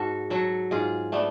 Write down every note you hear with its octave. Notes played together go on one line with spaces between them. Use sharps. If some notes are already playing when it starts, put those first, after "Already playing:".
Already playing: G#2 F#4 A4
F#3 F#4 A4
G#2 F4 G#4
A3 B3 D4